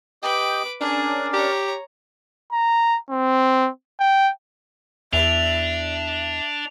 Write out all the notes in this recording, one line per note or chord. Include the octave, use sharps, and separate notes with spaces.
G4 B4 D#5 G5 D6
C#4 D4 G#4 A#4 D5
G4 C#5 A#5
A#5
C4
G5
E2 D4 E5 F7